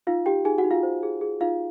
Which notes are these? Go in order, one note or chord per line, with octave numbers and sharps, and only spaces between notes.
D#4 F4 F5
D#4 G4 G5
D#4 G#4 G#5
F#4 F#5
D#4
F4 F5
C5
G#4
G#4
D#4 F4 F5